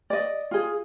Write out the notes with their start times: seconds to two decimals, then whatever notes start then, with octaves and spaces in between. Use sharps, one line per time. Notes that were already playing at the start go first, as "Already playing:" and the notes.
0.10 D5 D#5
0.51 F4 G#4